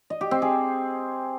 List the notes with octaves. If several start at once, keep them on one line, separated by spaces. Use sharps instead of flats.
D#5
G4
C4
G#4